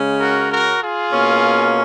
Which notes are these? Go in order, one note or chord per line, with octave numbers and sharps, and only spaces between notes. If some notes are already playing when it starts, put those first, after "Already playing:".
Already playing: C#3 G#3 C#4
F#4 A#4
F#4 A#4
F4 G#4
B2 A#3 C#4